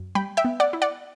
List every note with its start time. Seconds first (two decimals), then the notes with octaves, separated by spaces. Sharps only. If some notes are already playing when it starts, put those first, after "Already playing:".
Already playing: F#2
0.15 G3 G5 B5
0.37 E5 G5
0.45 B3
0.60 D5 F#5
0.73 E4
0.82 D5 F#5